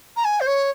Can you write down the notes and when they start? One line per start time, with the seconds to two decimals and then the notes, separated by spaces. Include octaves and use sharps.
0.16 A#5
0.24 G#5
0.40 C5
0.47 C#5